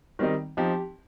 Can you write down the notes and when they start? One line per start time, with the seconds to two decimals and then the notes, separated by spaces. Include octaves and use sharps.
0.19 D#3 G3 C4 D#4
0.57 F3 C4 D#4 G4